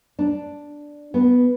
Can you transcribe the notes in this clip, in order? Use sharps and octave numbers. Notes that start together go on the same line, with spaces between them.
D4
B3